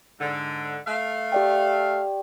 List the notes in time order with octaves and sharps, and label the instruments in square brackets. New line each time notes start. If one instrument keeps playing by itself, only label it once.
[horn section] G#2 D3
A3 F5
[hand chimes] G4 D5 G5